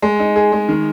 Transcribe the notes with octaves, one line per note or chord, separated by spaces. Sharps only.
G#3
D#4
G#4
G#3
D#3